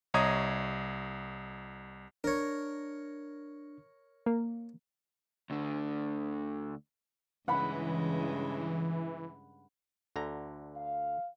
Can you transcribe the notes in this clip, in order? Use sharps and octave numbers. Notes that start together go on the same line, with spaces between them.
C2 C#5 D#5 A#5 D#6 G#6
D4 A#4 C#5
A#3
D2 D3
G2 C#3 E3 G#3 F#5 B5
D2 D3 A#5
F5